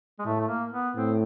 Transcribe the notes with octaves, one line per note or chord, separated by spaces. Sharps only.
G#3
A2 A3
A3
A#3
B3
A2 C4